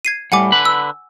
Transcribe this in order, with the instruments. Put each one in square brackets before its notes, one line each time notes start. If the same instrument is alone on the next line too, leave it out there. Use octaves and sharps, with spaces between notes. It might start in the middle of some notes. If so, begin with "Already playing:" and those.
[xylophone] G#6 C7 D#7
[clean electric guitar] A2 G3 [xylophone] F#5 G#5 D6
[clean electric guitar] D3 B4 B5
[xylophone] E6